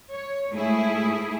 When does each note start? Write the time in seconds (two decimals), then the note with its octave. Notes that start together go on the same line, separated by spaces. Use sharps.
0.11 C#5
0.52 G#2 A3 E4 G#4